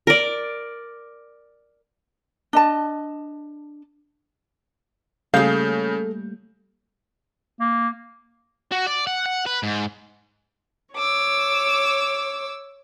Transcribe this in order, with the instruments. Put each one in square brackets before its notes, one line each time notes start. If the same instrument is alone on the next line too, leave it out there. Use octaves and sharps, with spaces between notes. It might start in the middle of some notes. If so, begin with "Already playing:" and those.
[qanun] A#4 D5
[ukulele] D4 D#5 A5
[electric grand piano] C#3 G6 [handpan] G3 A3 A#3 [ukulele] G#4 F5 [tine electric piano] A4
[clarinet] A#3
[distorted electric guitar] F#4
D5
F#5
F#5
B4
G#2
[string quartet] C#5 D6 E6